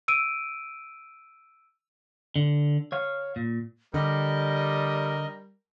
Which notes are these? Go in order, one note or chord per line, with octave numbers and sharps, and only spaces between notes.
E6 D7 D#7
D3
C#5 F5
A#2
D3 G3 A#4 D#5